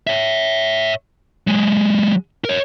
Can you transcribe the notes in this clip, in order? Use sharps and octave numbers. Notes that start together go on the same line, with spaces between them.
C#5 E5
F#3 G#3
A#4 C#5